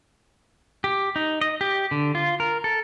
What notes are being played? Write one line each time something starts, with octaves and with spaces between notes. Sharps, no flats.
G4
D#4
D#5
G4
D3
F4
A#4
A4